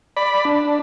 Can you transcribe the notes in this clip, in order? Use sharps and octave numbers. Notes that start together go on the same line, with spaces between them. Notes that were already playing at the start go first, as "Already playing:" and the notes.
D5 B5
D4